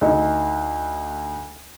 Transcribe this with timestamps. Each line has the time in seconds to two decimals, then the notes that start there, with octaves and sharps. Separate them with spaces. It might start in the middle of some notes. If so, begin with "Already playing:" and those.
0.01 D2 D#4